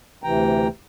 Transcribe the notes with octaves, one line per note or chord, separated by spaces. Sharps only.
D2 C3 E3 G5 A#5